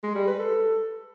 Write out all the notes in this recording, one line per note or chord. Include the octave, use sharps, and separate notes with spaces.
G#3
G3
B4
A4